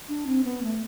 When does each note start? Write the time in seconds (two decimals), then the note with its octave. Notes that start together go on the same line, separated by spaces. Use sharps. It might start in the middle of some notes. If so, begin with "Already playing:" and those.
0.09 D4
0.27 C4
0.44 B3
0.63 A3